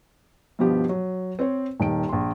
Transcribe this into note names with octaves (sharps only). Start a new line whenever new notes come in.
G2 B2 F3 B3 G4
F#3
C4 C5 C#5
D#1 D#3 D7
A#1 C6